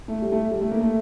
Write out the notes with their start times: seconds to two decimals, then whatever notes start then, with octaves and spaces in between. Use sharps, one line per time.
0.08 A3
0.22 G3
0.32 A3
0.51 G3
0.61 A3
0.71 A#3
0.81 A3